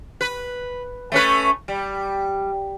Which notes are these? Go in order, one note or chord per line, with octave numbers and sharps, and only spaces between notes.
B4
A3 C#4 B4
G3